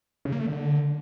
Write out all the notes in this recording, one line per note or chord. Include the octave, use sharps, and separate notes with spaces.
C#3
A#3
A3
D3